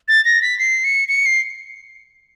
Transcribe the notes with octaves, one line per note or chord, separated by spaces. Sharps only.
A6
A#6
B6
C7
C#7
C#7
C7